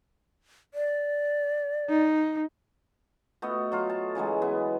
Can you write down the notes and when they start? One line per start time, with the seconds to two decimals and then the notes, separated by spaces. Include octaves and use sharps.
0.74 D5
1.89 D#4
3.42 A3 B3 F#4 D#5
3.72 F#3 F4 A4
3.90 A5
4.15 C#3 E3 F#3 G#3
4.42 B3